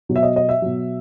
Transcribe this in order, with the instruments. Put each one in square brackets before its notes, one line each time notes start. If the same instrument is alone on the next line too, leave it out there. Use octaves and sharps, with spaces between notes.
[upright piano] B2 F#3
E5
D#5
D#5
E5
B2 F#3